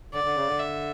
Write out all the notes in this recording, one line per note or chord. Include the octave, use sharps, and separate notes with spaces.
D3 D5
D3
C#3
D3
E5